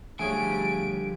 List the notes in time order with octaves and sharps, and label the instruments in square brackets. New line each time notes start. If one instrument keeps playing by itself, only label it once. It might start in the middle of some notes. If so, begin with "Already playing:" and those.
[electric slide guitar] D3 F3 G3 [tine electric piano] A3 G#4 C#5 [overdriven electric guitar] G#5 [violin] D7